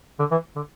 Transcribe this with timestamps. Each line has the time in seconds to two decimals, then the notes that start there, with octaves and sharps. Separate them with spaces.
0.19 D3
0.31 E3
0.56 D3